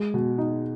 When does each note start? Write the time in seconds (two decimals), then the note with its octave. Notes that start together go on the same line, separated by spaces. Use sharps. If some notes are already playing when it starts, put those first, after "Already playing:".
Already playing: G#3
0.14 B2
0.38 D#4